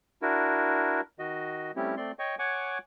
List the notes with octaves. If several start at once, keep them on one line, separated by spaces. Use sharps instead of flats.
D4 E4 F#4 A#4
D#3 F#4 D#5
G3 A3 C4 C#4 E4 G4
A3 C4 D5 C6
C#5 D#5 G5 C#6
C#5 F#5 G#5 C#6 D6